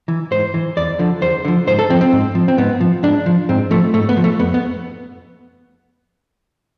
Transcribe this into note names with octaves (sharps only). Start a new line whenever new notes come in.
E3
G#2 C5
E3
E2 D5
D3 F3
E2 C5
D3 F3
G#2 C5
A4
F3 C4
C4
G#2
F3
C4
G#2 B3
F3
G#2 D4
F3
G#2 C4
F3 A3
G#2 A3
B3
F3
A3
F2 B3
B3